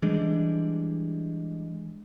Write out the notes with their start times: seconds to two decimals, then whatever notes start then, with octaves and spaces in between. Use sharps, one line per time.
0.02 E3 G3 G#3 D4